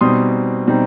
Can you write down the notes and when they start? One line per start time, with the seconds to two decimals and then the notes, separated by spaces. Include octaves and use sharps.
0.01 B2 G3 C4 D#4 C6 D#6
0.67 B2 G3 C4 D#4